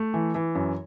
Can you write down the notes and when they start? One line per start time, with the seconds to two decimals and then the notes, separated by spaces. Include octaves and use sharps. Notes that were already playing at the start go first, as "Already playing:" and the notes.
Already playing: A3
0.14 E3
0.35 E3
0.55 F#2